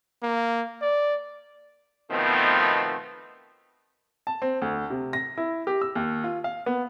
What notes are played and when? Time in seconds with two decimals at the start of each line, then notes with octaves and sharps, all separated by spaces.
0.22 A#3
0.81 D5
2.11 B2 D#3 F3 A3 B3 C4
4.27 A5
4.42 C4
4.62 D2
4.90 C3
5.13 A#6
5.38 E4
5.67 G4
5.82 E6
5.95 D#2
6.24 F4
6.44 F5
6.66 B3